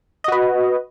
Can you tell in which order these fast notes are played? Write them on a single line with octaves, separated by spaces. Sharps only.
D#5 F#4 B4